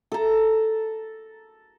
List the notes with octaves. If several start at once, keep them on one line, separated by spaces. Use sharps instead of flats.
A4 A#5